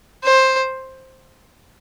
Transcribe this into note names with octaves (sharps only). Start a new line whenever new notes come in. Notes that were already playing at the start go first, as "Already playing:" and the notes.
C5